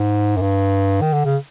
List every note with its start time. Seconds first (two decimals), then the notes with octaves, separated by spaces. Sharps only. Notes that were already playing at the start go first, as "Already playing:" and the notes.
Already playing: G#2
0.37 F#2
0.42 G2
1.01 D#3
1.13 D3
1.25 C#3